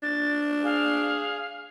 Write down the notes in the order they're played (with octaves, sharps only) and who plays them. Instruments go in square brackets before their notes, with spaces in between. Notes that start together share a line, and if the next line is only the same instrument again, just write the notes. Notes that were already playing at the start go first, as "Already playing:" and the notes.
[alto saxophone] D4 [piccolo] A6
[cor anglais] G#4 [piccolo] F5